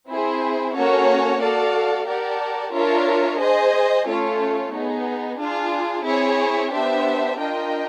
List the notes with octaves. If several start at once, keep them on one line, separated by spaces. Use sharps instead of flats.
C4 E4 G#4 C5
A#3 C#4 F#4 A4 C#5
F#4 A4 D5 F5
G4 A#4 D5 F#5 A5
D4 F4 A#4 C#5 E5
G#4 C5 D#5 G#5
A3 C#4 F4 A4 C#5
B3 D#4 G#4
D4 F4 G#4
C4 E4 G#4 C#5
B3 D4 G4 C5 E5
D4 F4 A#4 D#5 G5